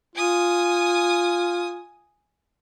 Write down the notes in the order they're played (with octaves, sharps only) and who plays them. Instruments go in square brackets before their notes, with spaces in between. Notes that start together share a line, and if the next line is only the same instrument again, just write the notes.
[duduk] F4 [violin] G#5 D#6